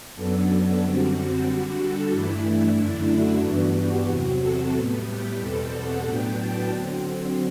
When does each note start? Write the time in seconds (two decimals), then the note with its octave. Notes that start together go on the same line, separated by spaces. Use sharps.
0.15 F#2 F#3 B3 D4 A4
0.48 A4
0.81 F#2 D3 G3 C4 F#4
1.13 F#4
1.47 D3 G3 D4 F#4
1.79 A4
2.12 G2 E3 A3 D4 E4
2.78 F#2 D3 A3 D4
3.10 F#4
3.42 G2 E3 B3 D4 F#4
3.75 G4
4.08 E2 C3 F#3 C4 F#4
4.40 A4
4.73 A2 G3 B3
5.06 G4
5.39 E2 B2 G3 C4 A4
5.72 F#5
6.04 A2 F#3 B3 D4 G5
6.36 A5
6.69 D3 F#3 C4